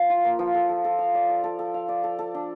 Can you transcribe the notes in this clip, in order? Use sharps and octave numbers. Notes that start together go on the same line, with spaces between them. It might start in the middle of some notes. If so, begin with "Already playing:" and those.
Already playing: F3
F4
A#3
F3
A4
A4
A4
F5
D5
D5
A4
A4
F5
D5
A4
A4
D4